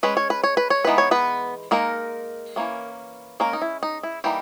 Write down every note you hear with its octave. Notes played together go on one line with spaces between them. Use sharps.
G#3 C#4 B4
C#5
B4
C#5
B4
C#5
E3 G#3 B3 D#4 B4
C#5
B3 B4
G#3 A#3 D#4 A#4
E3 A#3 C#4
G#3 A#3 C#4 A#4
D#4
E4
D#4
E4
E3 G3 A#3 D#4 G4